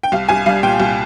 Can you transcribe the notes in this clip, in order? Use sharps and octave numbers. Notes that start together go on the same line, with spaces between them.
G5
C2 F5
C2 G#5
G3 F5
A#2 G5
C2